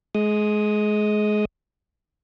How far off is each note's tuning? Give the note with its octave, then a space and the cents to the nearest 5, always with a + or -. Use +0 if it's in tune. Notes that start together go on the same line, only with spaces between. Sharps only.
G#3 +25 D#6 +0